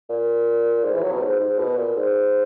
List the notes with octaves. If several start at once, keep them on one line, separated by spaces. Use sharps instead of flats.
A#2
G#2
E3
F#3
B2
G#2
G#2
B2
A#2
G#2